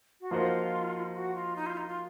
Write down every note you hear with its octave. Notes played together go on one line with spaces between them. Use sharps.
F#4
F3 A#3 D#4 F4 F#4 C5
F#4
F4
D#4
F4
D#4
F4